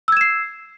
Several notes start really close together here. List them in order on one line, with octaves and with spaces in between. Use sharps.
E6 G#6 E7 C7